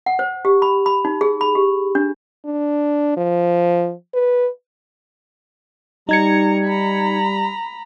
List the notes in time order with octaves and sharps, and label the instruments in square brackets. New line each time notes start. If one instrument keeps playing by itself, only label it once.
[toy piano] F#5
C5
G4
B5
B5
D#4
G#4
B5
G4
D4
[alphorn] D4
F3
B4
[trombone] G3 [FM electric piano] D#4 G#6 C#7 [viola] A#5
[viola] A#5 B5